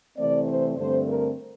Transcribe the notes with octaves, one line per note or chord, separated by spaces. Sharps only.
C3 E3 A3 C4 D5
C5
G2 D3 A3 C4 C5
A#4